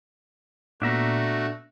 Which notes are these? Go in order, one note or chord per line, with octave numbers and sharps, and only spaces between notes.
A#2 A3 B3 D4 F#4 E5 A#5